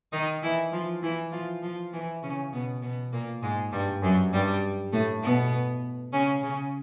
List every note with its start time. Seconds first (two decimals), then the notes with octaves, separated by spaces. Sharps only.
0.12 D#3 D#4
0.43 E3 E4
0.72 F3 F4
1.02 E3 E4
1.32 F3 F4
1.62 F3 F4
1.93 E3 E4
2.23 C#3 C#4
2.53 B2 B3
2.82 B2 B3
3.13 A#2 A#3
3.42 G#2 G#3
3.72 G2 G3
4.02 F#2 F#3
4.33 G2 G3
4.93 A2 A3
5.23 B2 B3
6.13 C#3 C#4
6.43 C#3 C#4